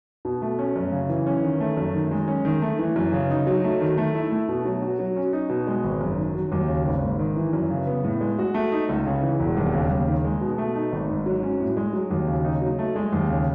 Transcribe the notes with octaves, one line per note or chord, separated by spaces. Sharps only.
B2
A3
C#4
F#2
C#3
E3
C#4
D#3
A3
F#2
D#3
G#3
C#4
D#3
A3
E3
F#2
C#3
D#4
F#3
A3
D#3
A3
E4
A3
B2
F#3
F#4
F#3
C#4
D#4
B2
G#3
G#1
F#2
D#3
F#3
D#2
C#3
G#1
G#2
D#3
E3
F#2
C#3
B3
A2
G#3
F#4
A3
D#4
C#2
C#3
E3
E1
D#2
C#3
D#2
D#3
G#3
B2
A3
D#4
G#1
G#2
F#3
C#4
A2
G#3
F#3
D#2
C#3
D#4
F#3
A3
G#3
D#2
C#3